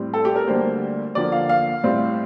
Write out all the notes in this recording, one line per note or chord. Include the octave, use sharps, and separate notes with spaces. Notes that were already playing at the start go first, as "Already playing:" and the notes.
Already playing: A2 G3 C4
A4
G4
A#4
D2 D3 G3 A#3 C5
D#2 D3 F3 A#3 D5
F5
F5
A2 G3 C4